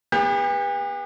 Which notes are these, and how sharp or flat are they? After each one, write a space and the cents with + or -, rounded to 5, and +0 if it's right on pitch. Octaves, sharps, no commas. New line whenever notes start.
B3 -15 G4 +45